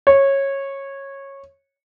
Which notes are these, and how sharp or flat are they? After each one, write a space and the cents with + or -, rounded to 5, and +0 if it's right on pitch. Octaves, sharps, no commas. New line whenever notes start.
C#5 -15